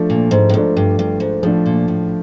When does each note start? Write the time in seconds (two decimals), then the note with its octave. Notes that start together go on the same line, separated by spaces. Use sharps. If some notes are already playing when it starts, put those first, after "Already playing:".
Already playing: F3 A3 D4
0.10 A#2
0.31 G#2
0.49 A2
0.54 G#2 F3 A3 D4
0.77 G2
0.99 G2
1.20 G#2
1.43 A2 F3 A3 D4
1.66 A#2
1.88 A2